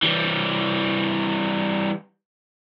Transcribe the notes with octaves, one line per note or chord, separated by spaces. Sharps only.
E3 G3